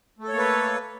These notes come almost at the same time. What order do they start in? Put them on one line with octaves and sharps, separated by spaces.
A3 A4 C#5 A#3 B4